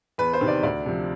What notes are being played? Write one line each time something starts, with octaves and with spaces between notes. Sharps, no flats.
E2 B4
C5
C3 D#3
D5
D2 D5
C3 F3